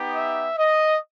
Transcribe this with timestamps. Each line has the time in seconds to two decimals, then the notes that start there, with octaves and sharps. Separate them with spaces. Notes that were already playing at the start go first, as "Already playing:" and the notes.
Already playing: B3 D#4 G4
0.15 E5
0.57 D#5